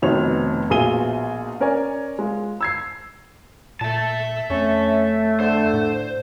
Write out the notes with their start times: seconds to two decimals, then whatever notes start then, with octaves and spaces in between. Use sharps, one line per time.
0.02 F1 F2 B2 D#3 C#5 F7
0.70 A#1 B2 F4 G#4 D#7 G7
1.60 C#4 A#4 C#5 D5 G#5
2.19 G#3 F4
2.61 E6 G#6 C7
3.81 A#2 E5 A5
4.50 F2 A3 C#4
5.40 D3 C5
5.74 A2